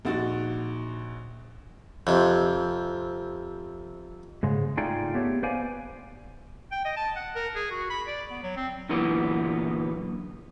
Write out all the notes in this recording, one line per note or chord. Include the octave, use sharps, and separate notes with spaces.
A#1 D#4 F#4 A6
F2 C3
G#2 C#3 G#3
A3 D#4 F4 G#4 D5 G5
A3 B3 G4 C#5
B3 B4 C5 D5 F5 G#5
G5
D#5
A5
F#5
A#4
G#4
F#4
B5
D5
B3
F#3
C4
F#2 A#2 D3 E3 B3